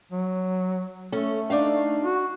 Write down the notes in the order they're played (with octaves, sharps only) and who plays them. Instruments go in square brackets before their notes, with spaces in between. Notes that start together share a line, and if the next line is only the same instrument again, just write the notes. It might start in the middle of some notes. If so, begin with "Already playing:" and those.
[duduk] F#3
[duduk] A3 [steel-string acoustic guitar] C#4 A4
[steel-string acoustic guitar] D4 D#4 F5
[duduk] F#4